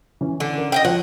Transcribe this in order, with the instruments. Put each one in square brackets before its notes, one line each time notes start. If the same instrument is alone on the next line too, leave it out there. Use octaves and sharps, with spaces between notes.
[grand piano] E3 C#4
[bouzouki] D3
[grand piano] A#4
[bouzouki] D#5 F5 G5
[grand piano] F3 C#5 [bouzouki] F#5